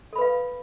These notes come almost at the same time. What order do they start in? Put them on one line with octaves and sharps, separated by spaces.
A4 B5 B4 F5